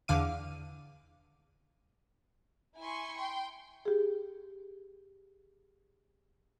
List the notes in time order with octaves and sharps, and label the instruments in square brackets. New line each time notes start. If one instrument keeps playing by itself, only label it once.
[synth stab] E2 D3 F5 D6 D#7
[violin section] E4 G#5 C6 C#6
G5 C6
[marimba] G4 G#4